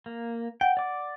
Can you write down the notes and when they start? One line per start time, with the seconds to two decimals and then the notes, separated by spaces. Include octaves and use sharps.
0.06 A#3
0.61 F#5 G5
0.77 D5 D6